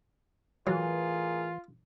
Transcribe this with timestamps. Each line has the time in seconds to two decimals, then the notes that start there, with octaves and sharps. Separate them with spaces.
0.67 A2 E3 F#3 F4 G#4 A#4